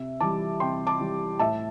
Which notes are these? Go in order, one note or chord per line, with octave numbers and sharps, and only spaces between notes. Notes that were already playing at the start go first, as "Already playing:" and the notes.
Already playing: C3 E5
E3 G3 A5 D6
C3 G5 C6
A5 D6
E3 G3
A2 E5 A5